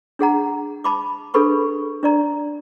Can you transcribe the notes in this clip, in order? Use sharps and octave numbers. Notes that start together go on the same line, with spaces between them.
D4 G#4 F#5 A#5
A5 B5 D6
D4 G#4 A4 B4 B5 C#6
D4 D5 A#5